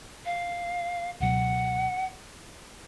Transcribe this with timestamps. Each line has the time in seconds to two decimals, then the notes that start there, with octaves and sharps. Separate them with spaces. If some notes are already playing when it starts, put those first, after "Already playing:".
0.25 F5
1.20 C#2 B2 F#3 F#5